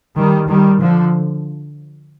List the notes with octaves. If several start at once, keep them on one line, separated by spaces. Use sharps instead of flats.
D#3 G3
D#3 G3
D3 F3